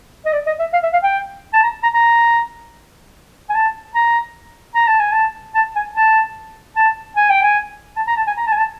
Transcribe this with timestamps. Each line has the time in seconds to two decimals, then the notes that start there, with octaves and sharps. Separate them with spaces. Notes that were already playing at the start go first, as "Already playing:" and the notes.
0.25 D#5
0.33 D5
0.47 D#5
0.59 E5
0.73 F5
0.83 E5
0.93 F5
1.04 G5
1.53 A5
1.63 A#5
1.83 A#5
1.94 A#5
3.50 G#5
3.55 A5
3.95 A#5
4.75 A#5
4.87 A5
5.00 G#5
5.12 A5
5.55 A5
5.76 G#5
5.96 A5
6.76 A5
7.16 G#5
7.30 G5
7.43 G#5
7.96 A5
8.07 A#5
8.17 A5
8.27 G#5
8.37 A#5
8.47 A5
8.52 G#5
8.58 A5